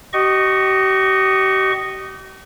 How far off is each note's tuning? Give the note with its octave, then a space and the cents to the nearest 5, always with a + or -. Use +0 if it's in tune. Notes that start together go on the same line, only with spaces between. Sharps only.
G4 -40 D#5 -10 C#6 +0